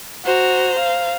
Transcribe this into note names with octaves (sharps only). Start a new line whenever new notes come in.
F#4 C5 A#5
F5